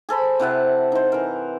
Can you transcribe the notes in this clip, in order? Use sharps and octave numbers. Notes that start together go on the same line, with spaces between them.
G#4 A4 C5 B5
C3 E4 F#5 A5
D#4 C5
E3 A#4